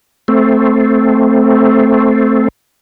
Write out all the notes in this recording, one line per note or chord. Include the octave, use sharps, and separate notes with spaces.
A3 C4